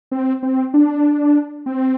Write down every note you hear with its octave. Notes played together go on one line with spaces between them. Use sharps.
C4
C4
D4
C4